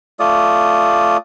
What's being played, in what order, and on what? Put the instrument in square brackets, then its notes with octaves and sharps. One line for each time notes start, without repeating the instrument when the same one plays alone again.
[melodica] A3 F4 D5 D#6